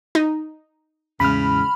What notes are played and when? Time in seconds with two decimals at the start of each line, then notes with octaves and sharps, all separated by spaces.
0.15 D#4
1.20 E2 A2 C#3 G#3 B5 F6